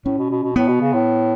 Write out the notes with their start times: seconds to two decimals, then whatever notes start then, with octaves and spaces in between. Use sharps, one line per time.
0.05 A2 C#4
0.18 B2
0.30 B2
0.43 B2
0.56 A2 B3
0.68 B2
0.81 C#3
0.93 A2